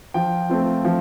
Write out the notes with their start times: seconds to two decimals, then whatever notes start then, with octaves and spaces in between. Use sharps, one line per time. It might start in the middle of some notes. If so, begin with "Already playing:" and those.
0.14 F3 G5
0.50 A3 C4 F4
0.85 F3